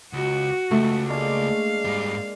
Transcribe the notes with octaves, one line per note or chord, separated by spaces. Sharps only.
C#2 F#4
C#2 A3
G#3 A#3 D4 F5
G#2 G3